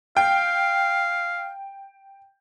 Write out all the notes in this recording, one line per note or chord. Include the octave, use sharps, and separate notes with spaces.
F5 G5